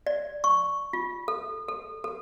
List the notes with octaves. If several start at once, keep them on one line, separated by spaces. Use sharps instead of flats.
D5
C#6
F4
A4
A4
A4